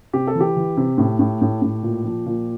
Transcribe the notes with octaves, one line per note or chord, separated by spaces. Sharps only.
C3 G4
A4
E3
G4
E3
C3
A2
A2
A2
A2
A#2
F3
A#2